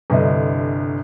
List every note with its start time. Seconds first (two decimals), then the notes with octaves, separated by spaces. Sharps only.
0.10 G1 C2 D3 D#5